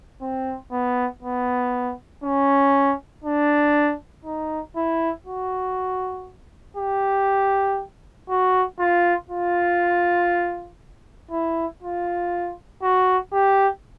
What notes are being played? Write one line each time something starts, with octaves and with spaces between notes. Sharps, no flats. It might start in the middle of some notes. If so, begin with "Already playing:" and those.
C4
B3
B3
C#4
D4
D#4
E4
F#4
G4
F#4
F4
F4
E4
F4
F#4
G4